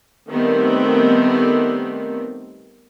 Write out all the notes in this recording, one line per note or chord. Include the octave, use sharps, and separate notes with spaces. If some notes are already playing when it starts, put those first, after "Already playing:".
D#3 G3 A3 B3 C4